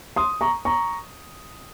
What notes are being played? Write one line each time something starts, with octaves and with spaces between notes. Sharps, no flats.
C6 D#6
A#5 C#6
A#5 C#6